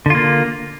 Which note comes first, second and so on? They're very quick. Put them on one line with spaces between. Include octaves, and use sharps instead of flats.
D3 F4 A#3